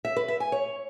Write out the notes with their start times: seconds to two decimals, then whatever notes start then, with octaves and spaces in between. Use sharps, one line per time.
0.05 E5
0.16 B4
0.28 E5
0.40 G#5
0.52 C#5